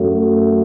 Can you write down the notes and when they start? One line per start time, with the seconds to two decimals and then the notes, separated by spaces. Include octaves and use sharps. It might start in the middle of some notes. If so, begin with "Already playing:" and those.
Already playing: F#2 F#3 A3